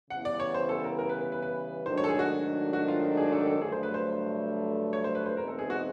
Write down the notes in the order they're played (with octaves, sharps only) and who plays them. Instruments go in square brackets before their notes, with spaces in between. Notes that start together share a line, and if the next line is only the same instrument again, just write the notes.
[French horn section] C#3 E3 G3 B3 E4 [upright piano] F#5
[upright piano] D5
C#5
C5
A4
A#4
A#4
B4
B4
B4
B4
[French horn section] G#2 D#3 F#3 A3 D4 [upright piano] C5
[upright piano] C#5
A4
G#4
F#4
F#4
F4
G#4
A4
A4
[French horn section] G2 D3 F#3 A3 [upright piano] G#4
[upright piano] C5
B4
C5
C#5
C5
B4
C5
[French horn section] E2 B2 G#3 C4 D#4 [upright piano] A#4
[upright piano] A4
G#4
F#4